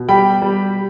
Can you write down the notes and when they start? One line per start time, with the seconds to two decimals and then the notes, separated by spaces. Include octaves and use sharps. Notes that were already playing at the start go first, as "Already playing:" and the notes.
Already playing: B2
0.09 G3 G5 B5
0.42 G3